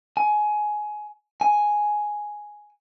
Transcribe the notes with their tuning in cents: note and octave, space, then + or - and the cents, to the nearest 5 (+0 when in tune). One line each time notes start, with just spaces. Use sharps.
G#5 +20
G#5 +5